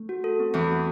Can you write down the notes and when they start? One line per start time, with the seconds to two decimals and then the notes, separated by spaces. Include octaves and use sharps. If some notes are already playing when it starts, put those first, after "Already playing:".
Already playing: A3
0.09 F#4
0.24 A4
0.40 C4
0.54 E2 E3 C4
0.70 F#4